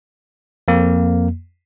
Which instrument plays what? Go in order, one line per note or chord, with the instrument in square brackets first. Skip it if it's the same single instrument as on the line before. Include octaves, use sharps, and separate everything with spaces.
[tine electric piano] F2 A#3